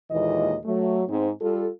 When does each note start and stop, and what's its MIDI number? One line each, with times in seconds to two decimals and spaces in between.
0.11 0.57 39
0.11 0.57 46
0.11 0.57 52
0.11 0.57 56
0.11 0.57 75
0.65 1.02 54
0.65 1.02 57
1.08 1.30 44
1.08 1.30 60
1.40 1.68 55
1.40 1.68 65
1.40 1.68 69